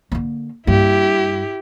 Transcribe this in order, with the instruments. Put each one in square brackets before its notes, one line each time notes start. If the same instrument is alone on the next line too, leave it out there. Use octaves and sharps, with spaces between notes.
[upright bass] D3 A#3
[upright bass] G2 A#3 [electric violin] E4 G4